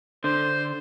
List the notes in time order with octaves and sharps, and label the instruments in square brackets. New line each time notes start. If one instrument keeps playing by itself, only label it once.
[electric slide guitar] D3 [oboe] C5